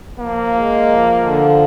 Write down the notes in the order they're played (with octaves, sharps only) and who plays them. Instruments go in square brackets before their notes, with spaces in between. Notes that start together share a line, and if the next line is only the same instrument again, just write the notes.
[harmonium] F3 [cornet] A#3
[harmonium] G#3
F3
D3